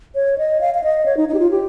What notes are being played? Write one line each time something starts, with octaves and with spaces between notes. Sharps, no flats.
C#5
D#5
F5
F5
D#5
C#5
D#4
D#4
G4
F4
G4